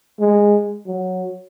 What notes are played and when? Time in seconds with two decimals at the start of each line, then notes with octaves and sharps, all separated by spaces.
0.20 G#3
0.87 F#3